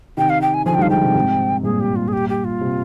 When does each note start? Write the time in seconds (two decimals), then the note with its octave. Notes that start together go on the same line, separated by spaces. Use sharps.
0.17 C3 D#3 G5
0.30 F5
0.42 G5
0.54 G#5
0.66 D3 F3 G#5
0.74 G5
0.78 D#3 G3 F5
0.90 F3 G#3 G5
1.03 C3 D#3
1.15 G#2 C3
1.63 G2 A#2 G#4
1.80 G4
1.96 F4
2.08 G#4
2.13 G4
2.29 G4
2.45 F4
2.61 C3